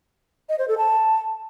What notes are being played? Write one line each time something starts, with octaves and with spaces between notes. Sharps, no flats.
D#5
C5
A4
A5